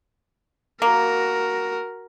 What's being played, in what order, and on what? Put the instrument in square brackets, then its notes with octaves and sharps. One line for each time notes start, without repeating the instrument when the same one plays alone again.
[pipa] A#3 [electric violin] F#4 A#4